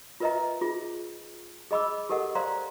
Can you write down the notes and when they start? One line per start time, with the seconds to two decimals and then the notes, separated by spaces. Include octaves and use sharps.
0.20 F4 A#4 B4 D#5 E5 A#5
0.61 F4 G#4
1.71 G#4 D#5 B5 D6 E6
2.09 G4 A4 A#4 D#5 F#5
2.35 C5 D5 F5 A#5 C6